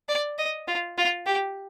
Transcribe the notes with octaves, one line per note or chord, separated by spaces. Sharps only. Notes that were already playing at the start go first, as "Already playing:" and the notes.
D5
D#5
F4
F4
G4